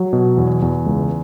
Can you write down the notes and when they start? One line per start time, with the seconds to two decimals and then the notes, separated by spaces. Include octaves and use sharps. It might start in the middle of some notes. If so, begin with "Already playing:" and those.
Already playing: F#3
0.13 B2
0.37 E2
0.62 E2
0.86 C#2